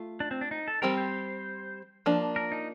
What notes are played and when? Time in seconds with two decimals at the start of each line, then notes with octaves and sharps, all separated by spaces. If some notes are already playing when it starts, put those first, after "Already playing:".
Already playing: A3 F4
0.20 D4
0.31 C4
0.41 D4
0.51 D#4
0.68 A4
0.82 G3 C4 G4 A#4
0.98 C5
2.06 F3 A#3 D4
2.36 A#4
2.52 D#4